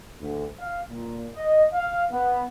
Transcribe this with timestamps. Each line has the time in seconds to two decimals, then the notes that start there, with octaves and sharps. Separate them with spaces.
0.20 D2
0.59 F5
0.90 A#2
1.36 D#5
1.72 F5
2.11 B3